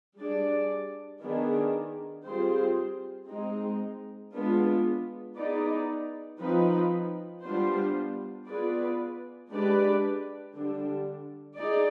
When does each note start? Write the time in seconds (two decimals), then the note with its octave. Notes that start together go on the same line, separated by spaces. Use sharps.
0.18 G3 D4 G#4 D5
1.22 D#3 B3 D4 G#4
2.25 G3 C4 F4 G#4 C5
3.29 G#3 C4 D#4
4.33 G#3 B3 D4 F4
5.36 B3 D#4 G#4 B4 D5
6.40 F3 C4 D#4 B4
7.43 G3 B3 D4 F4 C5
8.47 B3 F4 G#4 B4 D5
9.50 G#3 D4 G4 B4 D5
10.55 D3 G3 D4
11.57 D#4 G#4 D5